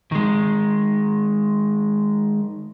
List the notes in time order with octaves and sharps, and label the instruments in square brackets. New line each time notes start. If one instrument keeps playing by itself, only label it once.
[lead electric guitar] D#3 G#3